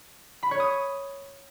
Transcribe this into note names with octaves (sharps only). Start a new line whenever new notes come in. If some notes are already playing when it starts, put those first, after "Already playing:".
B5
C#5
D#6